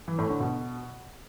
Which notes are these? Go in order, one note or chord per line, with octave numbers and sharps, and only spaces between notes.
E3
A2
D3
B2